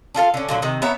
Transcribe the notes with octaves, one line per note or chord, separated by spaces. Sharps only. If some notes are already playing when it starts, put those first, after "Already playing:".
D4 F4 A4 F5
D3 C#4
A#2 D3 F#3
C3 D#3
B3 C#5 E5 A#5